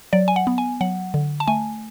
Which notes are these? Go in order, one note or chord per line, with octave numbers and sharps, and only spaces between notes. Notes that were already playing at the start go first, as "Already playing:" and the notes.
F#3 D5
G#5
F#5
B3
G#5
F#3 F#5
D3
A5
A3 G#5